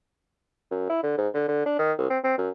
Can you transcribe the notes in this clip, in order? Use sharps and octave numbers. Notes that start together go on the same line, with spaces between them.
F#2
E4
D3
G#2
D3
D3
D4
D#3
C2
C4
C4
F#2